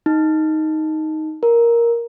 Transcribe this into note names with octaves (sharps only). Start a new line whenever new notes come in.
D#4
A#4